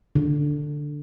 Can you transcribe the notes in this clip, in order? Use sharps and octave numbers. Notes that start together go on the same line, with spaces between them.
D3